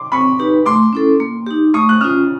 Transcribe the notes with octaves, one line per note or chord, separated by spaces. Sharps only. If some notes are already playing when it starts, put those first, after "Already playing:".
Already playing: C6 D6
C4 B5 C#6
D#4 G4 B4
A3 C6 D6
C#4 E4 A4
A#3
D#4 G4
A3 C#6 D#6
F#6
C#4 F4 D#6 F6